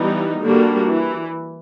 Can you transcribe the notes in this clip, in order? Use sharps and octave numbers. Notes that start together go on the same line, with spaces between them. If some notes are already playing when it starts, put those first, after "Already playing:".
Already playing: E3 G3 B3 D#4
D3 G3 A#3 D4 F#4
E3